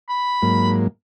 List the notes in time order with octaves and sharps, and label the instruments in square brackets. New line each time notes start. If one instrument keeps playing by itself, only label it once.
[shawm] B5
[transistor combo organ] G#2 F#3 A#3